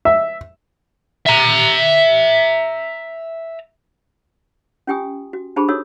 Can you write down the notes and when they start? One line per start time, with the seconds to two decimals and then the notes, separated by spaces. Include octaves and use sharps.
0.05 E5
1.26 E5 A#5
4.87 C#4 F4 G4 G5 G#5 D#6
5.33 F#4
5.56 D4 G4 G#4 C5 A5 B5
5.68 D#4 F#4 A4 C#5 D#6 E6